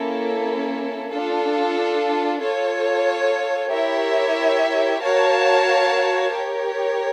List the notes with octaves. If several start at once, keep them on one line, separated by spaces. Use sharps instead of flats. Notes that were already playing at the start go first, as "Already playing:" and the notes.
Already playing: A#3 C#4 E4 A4
D4 F4 A4
F4 A4 C#5
E4 G4 A#4 C#5 E5
F#4 A#4 C#5 F5 A5
G4 A#4 C#5